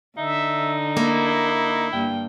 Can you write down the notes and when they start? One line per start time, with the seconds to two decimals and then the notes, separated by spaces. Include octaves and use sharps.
0.17 D3 D#4 E5
0.97 A#3 E4
1.93 G2 A#3 G5